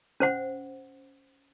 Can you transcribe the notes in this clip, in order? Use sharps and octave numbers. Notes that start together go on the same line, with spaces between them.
C#4 C5 F#5